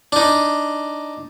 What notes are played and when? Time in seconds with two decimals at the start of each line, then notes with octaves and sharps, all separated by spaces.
0.12 D4 D#4